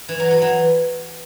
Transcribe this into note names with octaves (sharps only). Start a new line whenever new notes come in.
E3
F#3
F#3
E3